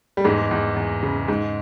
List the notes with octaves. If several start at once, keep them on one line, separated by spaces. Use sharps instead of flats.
G3
E2 G#2 G#3
E2
E2
C#3
G#2